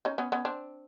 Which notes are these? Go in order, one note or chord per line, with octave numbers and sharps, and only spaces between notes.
C#4 D#4
B3 C#4
B3 C#4
C4 D4